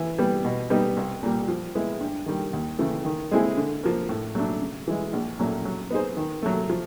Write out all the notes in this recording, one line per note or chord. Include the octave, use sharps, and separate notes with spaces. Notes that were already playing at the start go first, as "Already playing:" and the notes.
Already playing: E3
G3 B3
B2
G3 B3 D#4
C2
A#2 G3
F3
G#3 B3 E4
G2
D#3 G3
D#2
C#3 E3 A3
D#3
G#3 C4 E4 G#4
D3
F3 A#3
A2
F#3 A3 D4
C#3
E3 G#3
A#1
A#2 F#3 A3 C#4
F#3
B3 D#4 G#4 C5
D#3
F#3 A3
F3